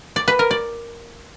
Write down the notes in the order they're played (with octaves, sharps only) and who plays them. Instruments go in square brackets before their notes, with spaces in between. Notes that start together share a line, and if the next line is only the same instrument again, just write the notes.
[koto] D5
B4
A#4
D5